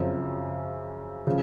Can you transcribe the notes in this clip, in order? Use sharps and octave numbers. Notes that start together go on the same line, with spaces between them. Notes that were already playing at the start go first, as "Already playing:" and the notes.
Already playing: F#2 C#3 F3 C4
C#3 F3